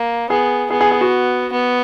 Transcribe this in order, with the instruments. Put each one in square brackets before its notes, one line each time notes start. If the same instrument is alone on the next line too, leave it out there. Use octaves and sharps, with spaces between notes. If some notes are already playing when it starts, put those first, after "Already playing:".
Already playing: [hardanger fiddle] A#3
[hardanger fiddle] B3 [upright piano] G#4
[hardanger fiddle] B3 [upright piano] G#4
[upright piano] G#4
G#4
F#4
[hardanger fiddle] B3